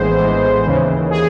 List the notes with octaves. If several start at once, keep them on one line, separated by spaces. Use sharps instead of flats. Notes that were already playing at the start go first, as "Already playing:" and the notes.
Already playing: A#1 A2 E3 G#3 B3 C5
A#1 A2 E3 G#3 B3
D#2 C#3 E3
G#4